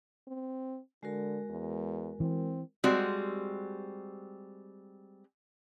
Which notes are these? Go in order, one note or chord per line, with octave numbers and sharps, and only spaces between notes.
C4
D3 G#3 F#4 A#4
E2
E3 C4
G3 G#3 C4 F#4